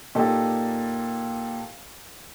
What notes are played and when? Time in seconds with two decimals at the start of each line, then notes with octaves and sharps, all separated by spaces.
0.15 A#2 D#4 G4 A4